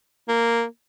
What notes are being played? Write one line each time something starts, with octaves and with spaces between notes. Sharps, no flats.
A#3